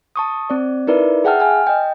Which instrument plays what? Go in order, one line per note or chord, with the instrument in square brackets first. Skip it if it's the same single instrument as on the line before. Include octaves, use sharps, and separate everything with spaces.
[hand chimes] A5 C#6 D#6
C4 D5
D#4 E4 A#4 B4 D5 E5
G#4 E5 F#5 G5 A5 F6
G#5 F6
D#5 G5